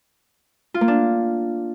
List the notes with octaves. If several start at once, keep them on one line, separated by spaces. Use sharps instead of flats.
F4
A#3
D4